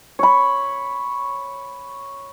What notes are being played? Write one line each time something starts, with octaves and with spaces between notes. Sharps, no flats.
C#5 B5